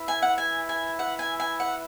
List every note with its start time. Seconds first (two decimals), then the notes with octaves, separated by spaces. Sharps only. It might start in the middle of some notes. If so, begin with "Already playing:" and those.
Already playing: E4 B4 E5
0.08 G#5
0.22 F#5
0.38 G#5
0.69 G#5
0.99 F#5
1.19 G#5
1.40 G#5
1.60 F#5